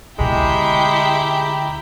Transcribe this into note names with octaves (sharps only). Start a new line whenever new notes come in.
D2 B2 G#3 E4 G4 G5 A#5 B5